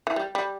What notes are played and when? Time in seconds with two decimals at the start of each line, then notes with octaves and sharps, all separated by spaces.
0.07 E3
0.16 G3
0.35 G3